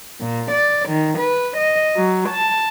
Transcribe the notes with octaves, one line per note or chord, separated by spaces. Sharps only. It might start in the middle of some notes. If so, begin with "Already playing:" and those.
A#2
D5
D#3
B4
D#5
F#3
A5